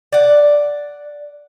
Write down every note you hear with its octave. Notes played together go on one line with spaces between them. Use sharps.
D5 F#5